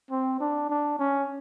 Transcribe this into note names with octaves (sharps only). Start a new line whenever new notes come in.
C4
D4
D4
C#4